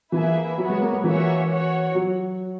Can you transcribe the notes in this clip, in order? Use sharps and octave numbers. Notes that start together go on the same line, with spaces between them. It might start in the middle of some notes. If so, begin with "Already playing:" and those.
E3 A#3 E4 G#4 B4 E5
F#3 B3 F#4 C#5
G#3
A#3
G#3
E3 A#3 C#4 F#4 C#5 E5
F#4 C#5 F#5
F#3